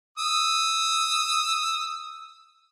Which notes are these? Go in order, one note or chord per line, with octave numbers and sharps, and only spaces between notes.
D#6 E6